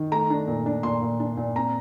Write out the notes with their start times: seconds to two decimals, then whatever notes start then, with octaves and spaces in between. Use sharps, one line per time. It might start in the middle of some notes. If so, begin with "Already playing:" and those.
Already playing: D#3
0.12 A3 A#5
0.30 D4
0.48 A#2
0.66 D4
0.83 A#2 C6
1.01 A#2
1.20 D4
1.37 A#2
1.55 C4 A#5